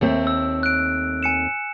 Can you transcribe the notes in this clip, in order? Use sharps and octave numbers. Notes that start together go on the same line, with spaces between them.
D#2 A3 C4
E6
F#6 D7
G#5 C#7 E7